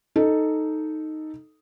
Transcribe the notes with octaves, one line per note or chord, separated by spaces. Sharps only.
D#4 A4